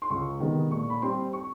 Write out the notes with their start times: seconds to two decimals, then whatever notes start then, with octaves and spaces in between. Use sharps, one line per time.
0.02 C6
0.10 C#2 C#6
0.40 C3 D#3 G#3 B3
0.71 A#2 C#6
0.90 B5
1.02 G3 C4 C6
1.33 C#6